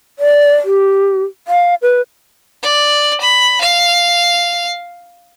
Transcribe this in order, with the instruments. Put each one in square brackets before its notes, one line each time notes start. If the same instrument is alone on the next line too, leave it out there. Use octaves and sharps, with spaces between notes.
[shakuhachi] D5
G4
F5
B4
[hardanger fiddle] D5
B5
F5